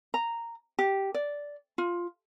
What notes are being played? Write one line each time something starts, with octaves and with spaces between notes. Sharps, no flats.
A#5
G4
D5
F4